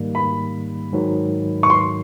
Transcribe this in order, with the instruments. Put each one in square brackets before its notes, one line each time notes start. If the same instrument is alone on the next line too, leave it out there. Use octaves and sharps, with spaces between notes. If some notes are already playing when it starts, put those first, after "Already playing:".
Already playing: [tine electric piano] G#2 D#3 G3 A#3
[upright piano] B5
[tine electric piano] G#2 D#3 F#3
[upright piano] C#6
C6